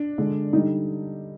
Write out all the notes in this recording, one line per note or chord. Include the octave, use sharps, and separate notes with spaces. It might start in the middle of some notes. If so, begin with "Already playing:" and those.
Already playing: D4
D3 G#3
D3 G3 D#4